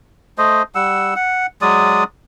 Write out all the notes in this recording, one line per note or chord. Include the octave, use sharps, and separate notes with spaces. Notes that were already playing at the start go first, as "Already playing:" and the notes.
A3 C5 D#5
G3 F#5 E6
F#5
F#3 G#3 D5 D#6